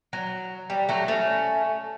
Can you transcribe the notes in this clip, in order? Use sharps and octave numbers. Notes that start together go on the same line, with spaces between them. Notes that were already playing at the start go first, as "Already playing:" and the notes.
F#3
G3
F#3 A3
A3 C#4